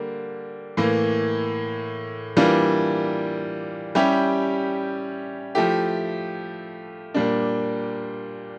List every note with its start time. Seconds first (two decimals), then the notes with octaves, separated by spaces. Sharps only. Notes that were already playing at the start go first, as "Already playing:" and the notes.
Already playing: D3 G3 A#3
0.77 A2 E3 A#3
2.36 E3 G3 A#3 D4 F4
3.95 G3 C#4 E4 G4
5.55 F3 A3 E4 G4
7.14 A#2 G3 A#3 D4